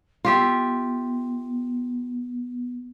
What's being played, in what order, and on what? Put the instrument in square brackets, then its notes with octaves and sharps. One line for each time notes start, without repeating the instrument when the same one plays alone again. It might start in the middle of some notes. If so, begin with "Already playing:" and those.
[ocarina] B3 [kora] F4 G4 E5